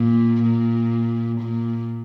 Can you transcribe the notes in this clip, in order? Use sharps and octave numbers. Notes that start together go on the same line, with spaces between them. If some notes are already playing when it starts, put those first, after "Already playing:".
Already playing: A#2
A#2
A#2